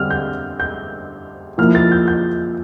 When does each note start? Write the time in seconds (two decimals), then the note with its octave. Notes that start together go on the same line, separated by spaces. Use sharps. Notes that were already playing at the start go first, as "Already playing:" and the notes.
Already playing: D3 G3 C4 F6
0.10 G6
0.60 G6
1.58 F3 A#3 E4 F6
1.75 A6
1.92 G6
2.08 G6